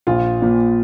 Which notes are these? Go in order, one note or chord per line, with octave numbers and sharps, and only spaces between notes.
A#1 F4
A#2 F3